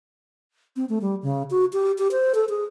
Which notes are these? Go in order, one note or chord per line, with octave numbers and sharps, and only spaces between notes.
C4
A3
G3
C#3
F#4
G4
G4
C5
A4
G#4